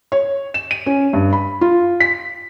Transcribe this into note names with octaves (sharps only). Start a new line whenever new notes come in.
C#5
E7
D#7
C#4
G2
B5
F4
B6